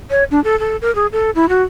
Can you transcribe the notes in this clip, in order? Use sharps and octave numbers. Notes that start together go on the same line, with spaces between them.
C#5
D4
A4
A4
A#4
G#4
A4
E4
F#4